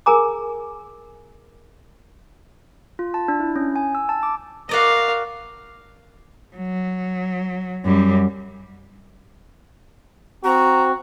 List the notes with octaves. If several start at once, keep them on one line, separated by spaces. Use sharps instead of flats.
G#4 A#4 G#5 A#5 D6
F4
A5
D4
E4
C#4
G#5
E6
A5
D6
F#4 A#4 D5 D#5 F5
F#3
F#2 G3
C4 F#4 A#5